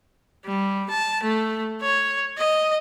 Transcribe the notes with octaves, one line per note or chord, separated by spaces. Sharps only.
G3
A5
A3
C#5
D#5